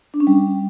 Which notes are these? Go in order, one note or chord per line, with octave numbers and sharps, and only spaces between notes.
D4
C#4
G3